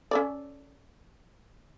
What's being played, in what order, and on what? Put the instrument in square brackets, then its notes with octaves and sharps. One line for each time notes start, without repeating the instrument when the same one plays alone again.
[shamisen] C#4 A4 D5